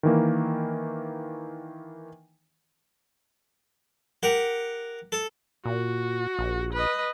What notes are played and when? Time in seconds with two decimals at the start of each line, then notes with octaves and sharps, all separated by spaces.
0.03 D#3 E3 A#3
4.23 G4 A#4 F#5
5.12 A4
5.65 A#2 F#4
6.39 A#1
6.73 B4 D#5